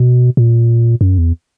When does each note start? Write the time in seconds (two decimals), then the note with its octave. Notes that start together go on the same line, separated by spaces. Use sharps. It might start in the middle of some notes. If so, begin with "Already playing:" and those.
Already playing: B2
0.37 A#2
1.01 F#2
1.18 E2